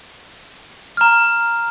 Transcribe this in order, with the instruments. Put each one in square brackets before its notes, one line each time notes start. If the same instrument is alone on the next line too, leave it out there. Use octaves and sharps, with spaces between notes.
[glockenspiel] A#5 F6